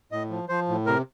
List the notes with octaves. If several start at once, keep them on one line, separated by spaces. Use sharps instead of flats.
A2 D#5
F3
F3 C5
A2
C3 A#4